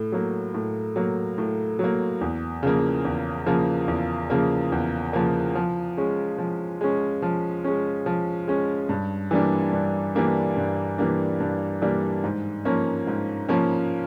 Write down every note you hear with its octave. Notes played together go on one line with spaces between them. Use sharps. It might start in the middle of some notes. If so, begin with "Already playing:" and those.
Already playing: A2
F#3 A#3
A2
F#3 A#3
A2
F#3 A#3
E2
C#3 F3 A#3
E2
C#3 F3 A#3
E2
C#3 F3 A#3
E2
C#3 F3 A#3
F3
G#3 C#4
F3
G#3 C#4
F3
G#3 C#4
F3
G#3 C#4
G2
E3 G3 A#3 D4
G2
E3 G3 A#3 D4
G2
E3 G3 A#3 D4
G2
E3 G3 A#3 D4
G#2
F3 A#3 C#4
G#2
F3 A#3 C#4